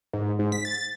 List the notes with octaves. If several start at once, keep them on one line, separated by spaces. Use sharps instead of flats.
G#2
G#2
B6
A6